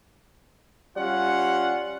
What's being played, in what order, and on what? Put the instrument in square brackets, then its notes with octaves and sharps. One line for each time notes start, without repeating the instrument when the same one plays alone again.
[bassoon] G3 [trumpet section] C#4 F4 F#5